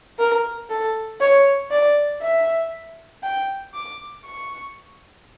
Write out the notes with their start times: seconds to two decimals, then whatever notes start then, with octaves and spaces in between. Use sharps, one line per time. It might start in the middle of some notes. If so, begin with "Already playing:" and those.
0.19 A#4
0.69 A4
1.20 C#5
1.71 D5
2.21 E5
3.23 G5
3.74 D6
4.25 C#6